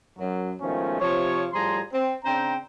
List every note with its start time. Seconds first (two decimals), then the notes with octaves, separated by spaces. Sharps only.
0.18 F#2 F#3
0.61 B2 D#3 F3 G#3 A3 C#4
1.01 C3 F3 C#5
1.53 A2 F3 G3 G#4 A#5 C6
1.94 C4
2.25 C#3 C4 D4 C5 G5 A#5